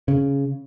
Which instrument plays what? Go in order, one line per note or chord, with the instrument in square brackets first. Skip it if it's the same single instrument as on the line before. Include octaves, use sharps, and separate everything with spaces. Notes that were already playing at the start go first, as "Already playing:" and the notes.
[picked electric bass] C#3